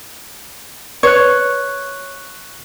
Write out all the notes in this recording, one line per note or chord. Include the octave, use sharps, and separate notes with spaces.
B4 C#5 C#6 F#6